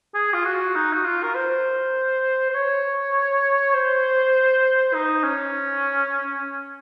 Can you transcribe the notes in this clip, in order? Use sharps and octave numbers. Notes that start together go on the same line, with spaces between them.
G#4
F4
F#4
D#4
F#4
F4
A#4
C5
C5
C#5
C5
D#4
C#4